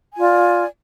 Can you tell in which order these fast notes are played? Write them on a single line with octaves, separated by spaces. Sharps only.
G#5 F4 D5